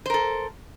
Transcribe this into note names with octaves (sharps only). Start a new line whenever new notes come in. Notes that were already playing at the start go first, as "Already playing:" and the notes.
A4 A#4 C5